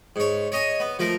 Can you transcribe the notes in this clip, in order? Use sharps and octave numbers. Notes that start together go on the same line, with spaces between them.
G#2 C#5
C#5 D#5 G#5
B3
F3 A3 A#4